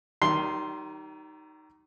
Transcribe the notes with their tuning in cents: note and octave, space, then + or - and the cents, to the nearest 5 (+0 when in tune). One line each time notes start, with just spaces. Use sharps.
D#3 +0 G3 -40 C6 +0